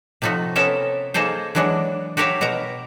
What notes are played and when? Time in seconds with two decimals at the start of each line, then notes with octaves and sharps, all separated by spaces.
0.22 C3 F3 A3 D#4 F#4
0.56 C3 B3 C#4 A4 A#4 E5
1.14 A#3 D#4 G#4 A4 C5
1.55 E3 F#3 G#3 D4 F#4
2.17 F#4 G4 A#4 C#5 E5 F5
2.41 B2 F#4 A#4 A#5